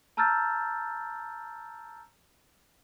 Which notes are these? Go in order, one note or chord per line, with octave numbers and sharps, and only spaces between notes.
A5 A#5 E6 F6 G6 A6